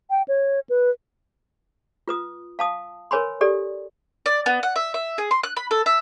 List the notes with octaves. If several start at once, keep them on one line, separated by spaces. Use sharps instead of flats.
G5
C#5
B4
F4 B4 D#6
F5 A5 D#6
A#4 B4 C#5 G#5 B5 C6
G4 A4 D5
D5
B3
F#5
E5
E5
G#4
C6
F#6
B5
A4
E5